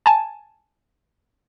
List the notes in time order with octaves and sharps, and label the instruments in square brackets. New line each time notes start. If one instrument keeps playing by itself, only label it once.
[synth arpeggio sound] G#5 A5